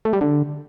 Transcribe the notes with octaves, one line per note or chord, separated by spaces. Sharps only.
A3
G3
D3